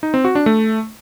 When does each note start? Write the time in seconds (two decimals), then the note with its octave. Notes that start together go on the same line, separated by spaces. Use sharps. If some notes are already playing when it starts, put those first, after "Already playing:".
0.03 D#4
0.14 C4
0.25 F#4
0.35 D4
0.46 A3